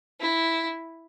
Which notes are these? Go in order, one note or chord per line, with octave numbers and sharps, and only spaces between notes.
E4